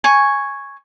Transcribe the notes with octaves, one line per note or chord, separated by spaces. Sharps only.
G#5 C#6